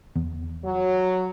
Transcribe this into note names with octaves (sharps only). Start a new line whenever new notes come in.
E2
F#3